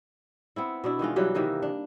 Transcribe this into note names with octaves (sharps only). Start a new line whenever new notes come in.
B3 C4 E4
B2 D4 E4
D#3 E3 G#3 F4
E3 F#3 G3 G4
C3 D#3 E3 A#3
D4